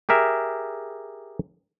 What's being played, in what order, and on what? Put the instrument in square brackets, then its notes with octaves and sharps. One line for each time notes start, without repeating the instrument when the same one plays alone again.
[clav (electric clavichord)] G4 G#4 A#4 E5